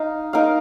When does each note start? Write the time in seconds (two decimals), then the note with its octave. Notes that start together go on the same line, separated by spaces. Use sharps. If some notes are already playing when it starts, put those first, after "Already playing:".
Already playing: D#4 F5
0.33 D#4 A#4 F5